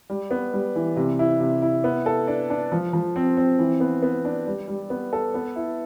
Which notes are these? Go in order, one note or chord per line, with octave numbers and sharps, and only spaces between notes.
G3
B3
G3
E3
C3
E4
C3
E4
B3
A4
D4
D4
F3
F3
C4
C4
E3
B3
B3
D4
G3
G3
B3
A4
B3
E4